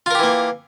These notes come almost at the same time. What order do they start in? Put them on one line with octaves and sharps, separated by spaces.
F4 A#4 G4 E3 A#3